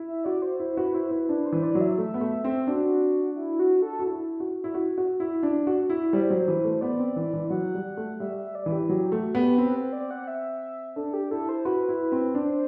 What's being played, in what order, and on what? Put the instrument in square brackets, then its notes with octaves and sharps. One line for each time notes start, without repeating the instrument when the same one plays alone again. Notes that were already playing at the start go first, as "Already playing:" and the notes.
Already playing: [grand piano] E4
[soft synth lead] E5
[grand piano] F#4 [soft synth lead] D5
[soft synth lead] C5
[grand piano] E4 [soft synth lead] C5
[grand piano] F#4 [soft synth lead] B4
[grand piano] E4 [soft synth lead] C5
[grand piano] E4 [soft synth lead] B4
[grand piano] D4 [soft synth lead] B4
[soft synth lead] C5
[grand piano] E3
[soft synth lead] D5
[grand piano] F#3
[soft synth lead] E5
[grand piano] A3 [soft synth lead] E5
[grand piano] B3
A3
C4
[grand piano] D4 [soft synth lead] F#4
[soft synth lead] E4
F#4
A4
[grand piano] F#4
E4
F#4
E4
F#4
F#4
E4
D4
F#4
E4
[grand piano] G3 [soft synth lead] C5
[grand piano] F#3
E3
A3
[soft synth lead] C5
[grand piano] B3 [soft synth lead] D5
[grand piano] C4
E3
E3
[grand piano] F#3 [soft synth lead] F#5
[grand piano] G3
A3
[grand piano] G3 [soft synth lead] E5
[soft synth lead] E5
D5
[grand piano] E3
[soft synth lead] G4
[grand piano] F#3 [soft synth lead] G4
[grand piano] A3 [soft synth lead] F#4
[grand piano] B3 [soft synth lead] G4
[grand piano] C4 [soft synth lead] B4
[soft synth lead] C5
D5
F#5
E5
[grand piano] D4 [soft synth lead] A4
[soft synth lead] G4
[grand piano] E4 [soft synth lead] A4
[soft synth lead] C5
[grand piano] F#4 [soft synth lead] B4
[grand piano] E4
C4
[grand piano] D4 [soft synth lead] C5